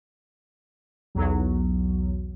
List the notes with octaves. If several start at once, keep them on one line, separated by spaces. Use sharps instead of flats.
B1 E2 F#3